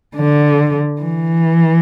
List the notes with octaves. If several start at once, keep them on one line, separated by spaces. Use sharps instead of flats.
D3
E3